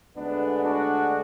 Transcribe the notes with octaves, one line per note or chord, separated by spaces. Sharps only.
D2 D3 G#3 B3 D4
D4 F#4